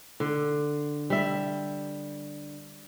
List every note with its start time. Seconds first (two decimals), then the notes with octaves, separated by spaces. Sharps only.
0.20 D3
1.10 G3 E5